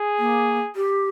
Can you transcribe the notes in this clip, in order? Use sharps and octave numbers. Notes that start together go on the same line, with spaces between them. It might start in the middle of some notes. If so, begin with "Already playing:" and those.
Already playing: G#4
A#3
G4